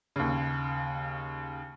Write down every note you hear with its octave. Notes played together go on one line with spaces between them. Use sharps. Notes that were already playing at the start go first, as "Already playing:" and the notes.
D#2 C#3